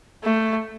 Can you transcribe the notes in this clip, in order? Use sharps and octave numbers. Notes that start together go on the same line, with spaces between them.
A3